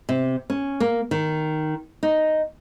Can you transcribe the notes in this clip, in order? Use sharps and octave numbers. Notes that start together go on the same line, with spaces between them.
C3
C#4
A#3
D#3
D#4